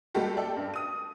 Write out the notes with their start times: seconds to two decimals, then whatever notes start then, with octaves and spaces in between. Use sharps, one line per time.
0.14 G3 G#3 A#3 F#4 G4 A4
0.37 A4 D5 E5 G5 A5
0.57 G2
0.74 D#6 D#7